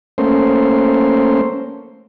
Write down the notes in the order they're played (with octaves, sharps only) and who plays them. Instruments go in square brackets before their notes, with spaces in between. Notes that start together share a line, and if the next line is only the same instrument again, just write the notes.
[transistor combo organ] A3 A#3 C#4 C5